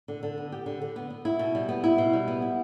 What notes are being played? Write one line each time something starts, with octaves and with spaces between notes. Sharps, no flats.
D3
D3
B3
G4
D3
D3
B3
B3
E4
B2
G3
B3
E4
B2
G3
B3
E4